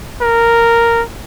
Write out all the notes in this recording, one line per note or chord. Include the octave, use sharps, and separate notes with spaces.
A#4